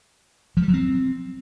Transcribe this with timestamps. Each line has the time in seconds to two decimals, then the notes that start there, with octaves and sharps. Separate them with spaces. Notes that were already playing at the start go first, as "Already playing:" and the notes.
0.57 F3
0.62 G3
0.68 F#3
0.74 C4